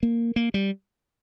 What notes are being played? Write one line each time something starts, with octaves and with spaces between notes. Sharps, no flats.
A#3
A#3
G3